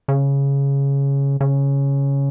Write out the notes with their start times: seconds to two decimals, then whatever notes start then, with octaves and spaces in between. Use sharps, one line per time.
0.08 C#3
1.41 C#3